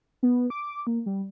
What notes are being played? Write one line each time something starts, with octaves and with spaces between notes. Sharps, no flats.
B3
D6
D6
A#3
G3